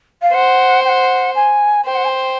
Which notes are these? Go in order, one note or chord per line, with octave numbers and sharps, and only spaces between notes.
F5
C5 F#5
G5
F#5
G#5
C5 G5
F#5
G#5
G5